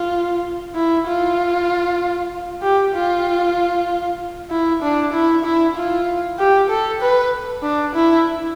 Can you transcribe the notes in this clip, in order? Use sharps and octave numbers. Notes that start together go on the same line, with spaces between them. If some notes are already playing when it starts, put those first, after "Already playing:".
Already playing: F4
E4
F4
G4
F4
E4
D4
E4
E4
F4
G4
A4
B4
D4
E4